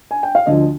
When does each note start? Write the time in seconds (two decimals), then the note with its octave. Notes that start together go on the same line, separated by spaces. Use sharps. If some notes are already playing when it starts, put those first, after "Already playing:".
0.11 G#5
0.23 G5
0.35 F5
0.46 D2 D3 F3 D#5